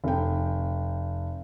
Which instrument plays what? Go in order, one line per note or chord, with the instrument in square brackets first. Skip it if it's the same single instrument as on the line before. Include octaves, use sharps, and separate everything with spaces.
[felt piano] F1 G5